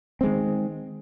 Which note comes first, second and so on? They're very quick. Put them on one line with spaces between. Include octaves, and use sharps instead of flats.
C4 G#3 D#3